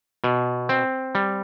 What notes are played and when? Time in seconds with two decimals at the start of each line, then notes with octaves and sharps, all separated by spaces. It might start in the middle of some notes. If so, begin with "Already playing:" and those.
0.24 B2
0.69 C4
1.15 G3